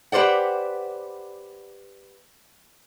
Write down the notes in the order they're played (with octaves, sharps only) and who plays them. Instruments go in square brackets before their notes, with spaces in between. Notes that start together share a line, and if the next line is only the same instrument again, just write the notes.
[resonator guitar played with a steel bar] G4 B4 C5 D5 F#5